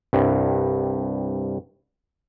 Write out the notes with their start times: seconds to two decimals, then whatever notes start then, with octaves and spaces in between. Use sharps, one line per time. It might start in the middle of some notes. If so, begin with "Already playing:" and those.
0.13 C2 G2